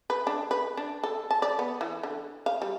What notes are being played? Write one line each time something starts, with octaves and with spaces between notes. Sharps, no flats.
B4
D4
B4
D4
A4
A5
D5
B3
E3
D3
F5
G3